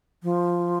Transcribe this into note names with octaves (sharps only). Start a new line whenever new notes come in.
F3